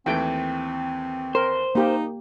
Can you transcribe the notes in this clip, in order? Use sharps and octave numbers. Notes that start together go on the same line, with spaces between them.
D#2 E3 A3 C4 G5
A#4 C5
A#3 D#4 G4